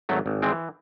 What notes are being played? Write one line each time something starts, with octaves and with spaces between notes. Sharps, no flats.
G#1 F#3 A3
G#1
E3 G#3 C4